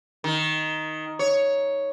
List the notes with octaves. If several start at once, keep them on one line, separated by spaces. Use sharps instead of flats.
D#3
C#5